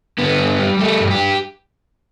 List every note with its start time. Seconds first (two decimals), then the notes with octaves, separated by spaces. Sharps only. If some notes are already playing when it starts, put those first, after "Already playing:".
0.18 D3 B3
0.39 G2
0.59 G3
0.79 G3 A3
1.00 G2
1.10 G4